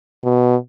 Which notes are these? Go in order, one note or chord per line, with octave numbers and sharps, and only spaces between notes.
B2